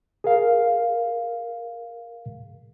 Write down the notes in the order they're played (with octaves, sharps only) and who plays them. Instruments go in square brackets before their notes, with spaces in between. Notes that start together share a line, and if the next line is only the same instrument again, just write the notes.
[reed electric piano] G#4 A#4 F5